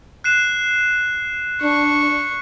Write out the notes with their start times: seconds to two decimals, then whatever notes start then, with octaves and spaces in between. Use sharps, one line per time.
0.24 F#6 C7 E7
1.62 D4 C#6